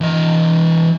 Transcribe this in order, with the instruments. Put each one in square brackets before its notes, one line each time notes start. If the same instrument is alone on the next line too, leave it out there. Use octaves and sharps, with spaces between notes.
[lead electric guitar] E3 D#5